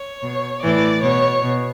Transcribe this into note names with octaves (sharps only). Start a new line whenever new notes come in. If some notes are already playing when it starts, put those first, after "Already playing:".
Already playing: C#5
B2
A2 E3 D5
B2 C#5
B2